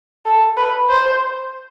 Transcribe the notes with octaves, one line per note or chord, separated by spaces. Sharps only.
A4
B4
C5